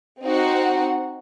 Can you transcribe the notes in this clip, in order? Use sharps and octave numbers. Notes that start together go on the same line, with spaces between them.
C4 D#4 F#4 C5 F#5